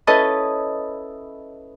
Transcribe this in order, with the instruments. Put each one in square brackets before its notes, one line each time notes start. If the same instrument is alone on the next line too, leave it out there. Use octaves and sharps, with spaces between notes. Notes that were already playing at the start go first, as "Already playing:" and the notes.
[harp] C#4 E4 A4 B4 D#5 A5